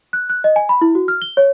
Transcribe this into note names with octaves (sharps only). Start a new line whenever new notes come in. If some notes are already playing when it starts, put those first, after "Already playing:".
F#6
F#6
D#5
G#5
B5
E4
F#4
F6
G7
C#5